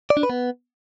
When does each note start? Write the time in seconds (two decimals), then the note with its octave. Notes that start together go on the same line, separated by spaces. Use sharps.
0.10 D5
0.17 D4
0.23 B4
0.30 B3